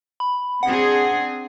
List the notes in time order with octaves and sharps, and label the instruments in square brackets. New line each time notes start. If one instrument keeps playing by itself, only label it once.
[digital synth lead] B5
[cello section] C4 D4 G#4 [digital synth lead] F#5